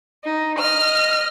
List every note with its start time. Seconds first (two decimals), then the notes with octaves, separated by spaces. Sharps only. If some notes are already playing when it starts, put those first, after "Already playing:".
0.24 D#4
0.59 D#5 F6